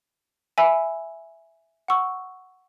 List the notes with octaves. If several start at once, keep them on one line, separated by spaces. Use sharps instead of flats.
E5 G#5 B5 E6
F#5 C#6 E6